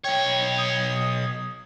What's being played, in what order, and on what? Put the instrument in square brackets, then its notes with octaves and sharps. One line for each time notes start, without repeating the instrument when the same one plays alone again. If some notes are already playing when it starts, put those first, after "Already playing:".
[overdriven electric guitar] B1 C#5 [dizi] G5
[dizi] D#6